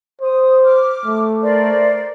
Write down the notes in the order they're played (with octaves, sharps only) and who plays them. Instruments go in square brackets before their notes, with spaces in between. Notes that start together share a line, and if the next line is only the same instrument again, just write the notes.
[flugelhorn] C5 [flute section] D#6
[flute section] D6 F6
[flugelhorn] A3
[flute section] A#4 C5 D5